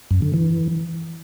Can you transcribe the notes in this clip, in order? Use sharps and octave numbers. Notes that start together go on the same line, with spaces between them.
F#2
D3
E3